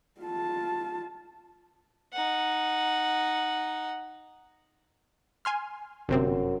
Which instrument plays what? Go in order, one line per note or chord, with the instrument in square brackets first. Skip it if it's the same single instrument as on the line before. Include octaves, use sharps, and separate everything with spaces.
[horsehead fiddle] F4 A5
[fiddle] D#4 F#5
[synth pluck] G#5 C6 F6
[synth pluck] G1 C3 C4 [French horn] F#2